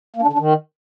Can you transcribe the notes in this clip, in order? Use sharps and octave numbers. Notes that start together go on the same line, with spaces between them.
A#3
D4
D3
D4
D#3